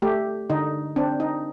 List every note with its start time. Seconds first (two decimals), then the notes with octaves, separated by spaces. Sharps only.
0.02 A3 G4
0.50 D3 D#4
0.96 C4 D4
1.20 D#4